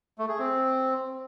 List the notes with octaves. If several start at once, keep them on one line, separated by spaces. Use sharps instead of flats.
A3
G#4
C4